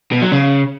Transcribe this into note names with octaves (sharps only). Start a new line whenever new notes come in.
B2
F#3
C#3